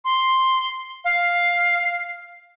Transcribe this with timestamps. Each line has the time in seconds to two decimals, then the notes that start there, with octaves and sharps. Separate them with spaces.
0.05 C6
1.05 F5